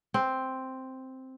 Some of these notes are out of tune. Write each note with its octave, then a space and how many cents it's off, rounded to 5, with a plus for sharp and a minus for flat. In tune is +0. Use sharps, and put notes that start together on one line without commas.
C4 +0